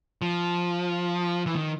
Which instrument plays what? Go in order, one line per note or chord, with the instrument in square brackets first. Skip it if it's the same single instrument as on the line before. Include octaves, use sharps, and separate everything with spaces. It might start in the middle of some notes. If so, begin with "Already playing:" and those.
[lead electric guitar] F3
E3
D#3